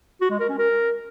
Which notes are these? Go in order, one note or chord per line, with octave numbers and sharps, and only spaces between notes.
F#4
G#3
A#4
C#4
A#4